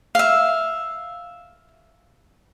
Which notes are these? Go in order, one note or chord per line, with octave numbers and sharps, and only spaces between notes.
E5 F5